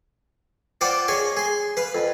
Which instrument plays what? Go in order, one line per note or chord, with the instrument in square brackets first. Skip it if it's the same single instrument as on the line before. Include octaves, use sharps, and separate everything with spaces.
[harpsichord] F4 C5 D5 F#5 G5
G#4 C#5 D#5 G#5
G#4 C6
B4 F5
F2